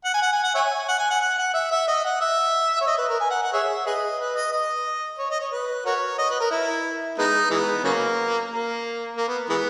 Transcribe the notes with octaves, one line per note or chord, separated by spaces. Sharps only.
F#5
G#5
F#5
G#5
F#5
C#5 E5 G#5
F#5
G#5
F#5
F#5
F#5
E5
E5
D#5
F#5
E5
C#5
D#5
B4
A#4
G#5
F#5
F#5
G#4 C#5 E5
G#4 B4 D#5
B4
D#5
D#5
C#5
D#5
C#5
B4
F#4 A#4 C#5
D#5
B4
A#4
E4
G#3 B3 D#4
E3 G#3 B3
C#3 F#3 A#3
A#3
A#3
B3
E3 G#3 B3